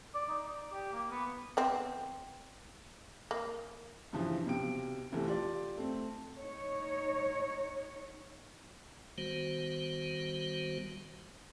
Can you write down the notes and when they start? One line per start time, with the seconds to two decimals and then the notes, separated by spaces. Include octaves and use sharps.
0.15 D5
0.29 D#4
0.48 D5
0.73 G4
0.93 A#3
1.11 B3
1.57 B3 C4
3.31 A#3
4.13 G2 C#3 E3 F3
4.45 B1 C3 G5 D7
5.12 C2 C3 E3 A3
5.26 F4 G4 D5
5.77 A3 C4
6.38 D#4 C#5
9.18 D#3 G3 B3 F#4 C5